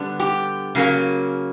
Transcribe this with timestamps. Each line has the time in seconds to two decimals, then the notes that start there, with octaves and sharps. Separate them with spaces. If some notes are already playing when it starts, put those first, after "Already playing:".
Already playing: D3 G3 B3 D4
0.20 G4
0.75 C#3 F#3 A#3